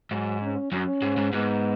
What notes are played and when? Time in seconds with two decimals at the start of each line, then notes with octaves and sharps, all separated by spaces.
0.11 G#2 F#3
0.41 C#4
0.72 F#2 C#4
1.02 G#2
1.17 G#2
1.32 G#2 B3